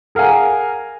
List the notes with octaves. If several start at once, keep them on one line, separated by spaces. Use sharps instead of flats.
G#4 A#4 F5 F#5 G#5